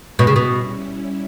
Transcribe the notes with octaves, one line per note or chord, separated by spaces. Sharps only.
B2 G3 C#4 E4
C#3
B2